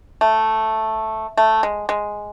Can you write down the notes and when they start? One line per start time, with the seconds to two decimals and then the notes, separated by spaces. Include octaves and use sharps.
0.21 A3
1.37 A3
1.63 G#3
1.89 G#3